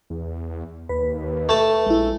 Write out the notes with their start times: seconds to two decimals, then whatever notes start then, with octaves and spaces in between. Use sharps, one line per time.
0.10 E2
0.89 D#2 B4
1.49 A3 A5
1.86 A#1 G#3 E4